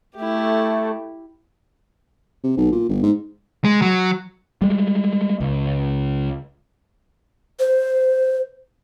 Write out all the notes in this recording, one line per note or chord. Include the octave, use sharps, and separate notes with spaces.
A3 E4 G4
C3
B1
A#2
G1
G#2
G#3
F#3
G3 G#3
C#2
C5